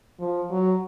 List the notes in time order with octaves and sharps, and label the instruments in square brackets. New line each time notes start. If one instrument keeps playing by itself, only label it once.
[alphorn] F3
F#3